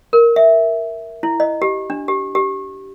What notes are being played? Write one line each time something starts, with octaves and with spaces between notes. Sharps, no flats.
A#4
E5
E4
D#5
G4
D4
G4
G4